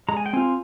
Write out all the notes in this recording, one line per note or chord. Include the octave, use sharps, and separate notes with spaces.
G#3 A#5
G#5
G5
C4 F4 G#5